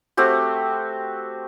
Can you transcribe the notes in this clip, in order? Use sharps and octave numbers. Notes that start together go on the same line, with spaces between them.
A3 C4 F#4 G4